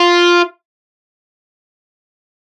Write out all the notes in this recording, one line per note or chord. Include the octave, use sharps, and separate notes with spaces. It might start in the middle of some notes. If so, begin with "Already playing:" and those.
Already playing: F4